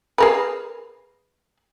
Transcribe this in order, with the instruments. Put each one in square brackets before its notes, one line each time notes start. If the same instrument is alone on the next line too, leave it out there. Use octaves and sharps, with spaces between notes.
[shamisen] G#4 A#4 B4